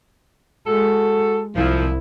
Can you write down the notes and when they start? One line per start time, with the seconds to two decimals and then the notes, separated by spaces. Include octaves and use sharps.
0.67 G#3 F#4 A4
1.55 C2 F3 E4